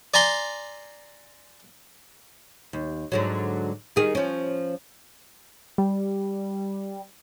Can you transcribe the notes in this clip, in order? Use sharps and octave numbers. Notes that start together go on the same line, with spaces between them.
D5 G#5 A#5 C6
D#2
G#2 D3 F#3
D#3 G#4
F3 C#4
G3